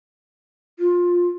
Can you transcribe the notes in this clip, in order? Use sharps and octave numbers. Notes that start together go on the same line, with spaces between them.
F4